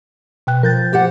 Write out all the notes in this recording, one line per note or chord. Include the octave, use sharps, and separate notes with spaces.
B2 G5 F#6
F3 A#4 G6 A6
G4 C5 F#5